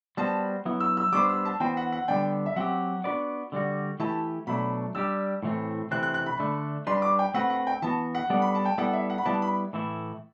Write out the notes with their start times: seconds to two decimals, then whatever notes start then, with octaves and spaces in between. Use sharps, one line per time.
0.17 G3 B3 F#4 C5 A5
0.65 F#3 B3 E4
0.80 E6
0.97 E6
1.13 G3 B3 D4 A4 C5 D6
1.29 E6
1.45 A5
1.60 E3 B3 F#4 C5 G5
1.77 F#5
1.92 F#5
2.08 D3 G3 B3 D4 G5
2.46 E5
2.56 F#3 C4 G4 F#5
3.04 B3 D4 F#4 B4 D5
3.52 D3 G3 B3 F#4
4.00 E3 A3 E4 G4 B4 A5
4.47 B2 F#3 A3 D4 B5
4.95 G3 D4 G4 E6
5.43 A2 E3 A3 C4
5.91 C3 E3 A3 C4 F#6
6.03 F#6
6.14 F#6
6.26 B5
6.39 D3 A3 D4
6.87 G3 D4 G4 B4 C6
7.02 D6
7.19 G5
7.34 A3 C4 F#4 B4 F#5
7.50 F#5
7.67 G5
7.82 E3 B3 F#4 A5
8.15 F#5
8.30 G3 B3 D4 A4 D5
8.42 B5
8.55 A5
8.65 G5
8.78 G3 B3 E4 A4 D5 F#5
8.93 E5
9.10 F#5
9.18 B5
9.25 G3 B3 E4 B4 D5 A5
9.42 B5
9.73 A2 E3 A3 E4